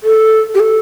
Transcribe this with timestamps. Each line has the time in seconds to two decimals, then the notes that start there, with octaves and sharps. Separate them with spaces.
0.03 A4
0.54 G4
0.60 A4